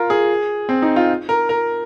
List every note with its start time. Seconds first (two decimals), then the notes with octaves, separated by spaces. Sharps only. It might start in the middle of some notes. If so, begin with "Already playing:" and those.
Already playing: F4 A#4
0.10 G#4
0.69 C4
0.82 D#4
0.96 F4
1.29 A#4
1.49 A#4